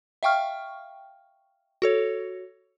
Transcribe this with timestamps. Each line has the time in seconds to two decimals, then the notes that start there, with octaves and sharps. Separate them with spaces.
0.23 E5 F5 G5 C#6 F6
1.82 F#4 A4 C#5